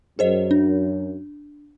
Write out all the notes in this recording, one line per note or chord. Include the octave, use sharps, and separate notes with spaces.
F#2 G#4 C5 D#5
D4